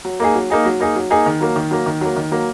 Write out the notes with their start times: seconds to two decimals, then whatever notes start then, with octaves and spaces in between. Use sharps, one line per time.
0.05 F#3
0.20 A#3 D#4 G#4
0.35 F#3
0.50 A#3 D#4 G#4
0.65 F#3
0.80 A#3 D#4 G#4
0.96 F#3
1.10 A#3 D#4 G#4
1.26 D#3
1.41 F#3 A#3
1.56 D#3
1.71 F#3 A#3
1.86 D#3
2.01 F#3 A#3
2.16 D#3
2.31 F#3 A#3